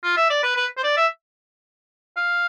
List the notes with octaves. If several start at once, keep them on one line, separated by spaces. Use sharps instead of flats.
F4
E5
D5
B4
B4
C5
D5
E5
F5